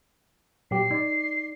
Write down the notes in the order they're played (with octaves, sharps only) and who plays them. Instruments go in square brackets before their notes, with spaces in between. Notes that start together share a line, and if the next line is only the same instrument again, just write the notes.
[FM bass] A#2 [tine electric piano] F#3 G4 [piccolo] C7
[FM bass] D#4 [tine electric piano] D5